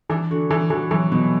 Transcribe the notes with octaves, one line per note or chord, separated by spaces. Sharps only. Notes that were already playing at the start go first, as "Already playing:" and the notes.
E3 D4
D3 F#4
E3 D4
E3 F#4
E3 F#3
B2 F#3